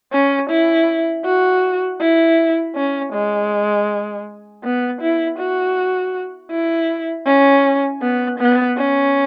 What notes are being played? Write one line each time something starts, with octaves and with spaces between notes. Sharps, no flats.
C#4
E4
F#4
E4
C#4
G#3
B3
E4
F#4
E4
C#4
B3
B3
C#4